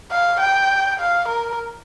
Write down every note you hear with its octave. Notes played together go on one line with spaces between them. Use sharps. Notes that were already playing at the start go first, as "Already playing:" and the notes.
F5
G5
F5
A#4